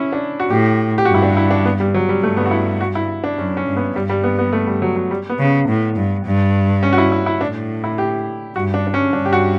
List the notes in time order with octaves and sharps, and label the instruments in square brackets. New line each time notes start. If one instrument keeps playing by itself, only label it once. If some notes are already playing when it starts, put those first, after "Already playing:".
Already playing: [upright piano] C#4 E4
D4
F#4
[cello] A2 [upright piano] G4
[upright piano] G4
[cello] G2 [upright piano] F#4
[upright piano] E4
D4
E4
D4
B3
G3
F#3
G3
[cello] G2 [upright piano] A3
[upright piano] B3
F#4
E4
F#4
E4
D4
[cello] F#2 [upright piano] C#4
[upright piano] C#4
[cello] G2
[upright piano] B3
[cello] G2 [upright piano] G3
[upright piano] G3
B3
B3
A3
G3
F#3
F#3
G3
B3
[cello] C#3
A2
G2
G2
[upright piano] C#4
F#4
E4
E4
E4
[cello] A2 [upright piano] D4
[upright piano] E4
G4
[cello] G2 [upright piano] F#4
[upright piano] D4
D4
C#4
[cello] G2 [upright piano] D4
[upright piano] G4
F#4